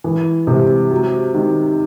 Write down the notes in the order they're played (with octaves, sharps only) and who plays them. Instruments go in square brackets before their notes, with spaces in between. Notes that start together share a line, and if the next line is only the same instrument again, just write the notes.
[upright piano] E3
C3
F#3
D#3